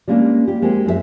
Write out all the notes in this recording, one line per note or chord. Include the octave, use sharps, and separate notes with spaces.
G3 G#3 A#3 C#4 D4
G4
G#3 A#3 C4 G4
F#2 G#4 E5